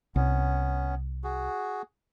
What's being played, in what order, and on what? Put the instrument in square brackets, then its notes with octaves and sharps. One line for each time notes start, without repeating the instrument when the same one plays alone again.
[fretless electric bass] C2 [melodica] B3 C#4
[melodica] F#4 G#4